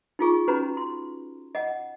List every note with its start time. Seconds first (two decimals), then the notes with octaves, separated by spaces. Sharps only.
0.19 D#4 F4 G#4 C#6
0.48 C#4 D#4 F#4 B4 A#5 B5
0.77 C6
1.55 D#5 F#5